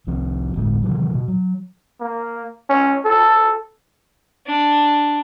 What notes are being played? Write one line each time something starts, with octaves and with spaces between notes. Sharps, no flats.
C2 F3 C4
G1 D2 A2 G#3
C3 D#3 E3 F#3
B2
F#3
A#3
C#4
A4
D4